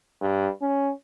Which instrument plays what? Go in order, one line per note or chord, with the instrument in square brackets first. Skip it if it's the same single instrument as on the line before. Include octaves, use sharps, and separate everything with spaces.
[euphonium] G2
C#4